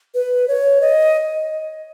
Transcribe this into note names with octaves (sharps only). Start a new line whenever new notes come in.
B4
C#5
D#5